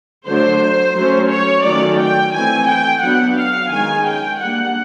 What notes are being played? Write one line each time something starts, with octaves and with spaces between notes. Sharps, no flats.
D3 F#3 A3 D4 C5
F#3 A3 C#4
C#5
D#3 F#3 A3 C#4 D5
G5
E3 A3 C4 G#5
G5
F#3 B3 D4 F#5
F5
D#3 G#3 C#4 G#5
G5
G3 A#3 D4 F#5